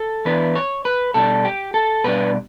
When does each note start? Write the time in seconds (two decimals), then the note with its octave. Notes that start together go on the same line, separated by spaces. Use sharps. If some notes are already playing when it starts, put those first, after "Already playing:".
Already playing: A4
0.25 E3 B3 D4 B4
0.55 C#5
0.85 B4
1.14 B2 G3 D4 A4
1.45 G4
1.74 A4
2.04 B2 G3 D4 B4